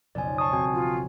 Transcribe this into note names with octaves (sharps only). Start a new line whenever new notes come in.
B1 F2 C#3 D5 G#5
A5 C#6 D#6
E1 C4 F#4 G#5
F4